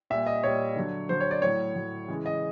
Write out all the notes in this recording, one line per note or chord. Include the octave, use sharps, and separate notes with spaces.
A#2 G3 E5
D#5
A#2 G3 C#5
D3 F#3
D3 F#3 C5
C#5
D5
A2 F#3 C#5
A2 F#3
C#3 E3 G#3
D#5